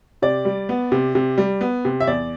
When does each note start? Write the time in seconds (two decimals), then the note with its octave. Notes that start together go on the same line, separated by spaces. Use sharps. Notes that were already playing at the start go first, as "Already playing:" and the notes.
0.22 C3 D5
0.45 G3
0.69 B3
0.92 C3
1.15 C3
1.38 G3
1.61 B3
1.85 C3
2.00 E5
2.07 E2 D5